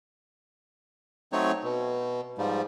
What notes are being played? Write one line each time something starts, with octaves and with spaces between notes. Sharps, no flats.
F#3 A3 C4 D#4 C#5
B2
G#2 F3 G3